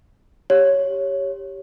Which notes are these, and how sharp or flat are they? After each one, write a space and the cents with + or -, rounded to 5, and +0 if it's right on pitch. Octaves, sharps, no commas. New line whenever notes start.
G4 +0 C#5 +0